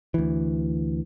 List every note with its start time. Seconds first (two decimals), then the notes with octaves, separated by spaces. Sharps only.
0.14 D2 E3